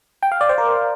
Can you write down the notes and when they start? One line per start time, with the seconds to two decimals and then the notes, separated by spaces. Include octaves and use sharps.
0.23 G5
0.32 F5
0.41 D5
0.49 C5
0.58 A#4